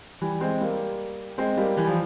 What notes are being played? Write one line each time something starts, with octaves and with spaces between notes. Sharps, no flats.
E3 G3
G#3 C4
G3 A#3
G#3 C4
G3 A#3
E3 G3
F3